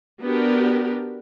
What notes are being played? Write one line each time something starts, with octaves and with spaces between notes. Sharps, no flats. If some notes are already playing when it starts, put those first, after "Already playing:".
B3 D4 F#4 G4 A#4